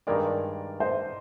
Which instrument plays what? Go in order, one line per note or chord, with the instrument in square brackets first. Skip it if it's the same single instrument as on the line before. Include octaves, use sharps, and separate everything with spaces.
[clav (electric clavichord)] G2 D#3 G#3 [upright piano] A#4 D5
[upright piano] C5 D#5